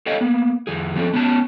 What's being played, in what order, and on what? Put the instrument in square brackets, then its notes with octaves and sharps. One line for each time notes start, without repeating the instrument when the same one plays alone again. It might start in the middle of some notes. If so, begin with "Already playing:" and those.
[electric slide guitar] A4 C#5 D#5 F5 G5
A#3 B3
F2 G#4
F3 C4 C#4 A4
B3 C#4 A5